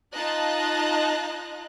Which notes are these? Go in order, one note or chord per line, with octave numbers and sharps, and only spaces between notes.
D#4 F4 D#5 A5 A#5 F#6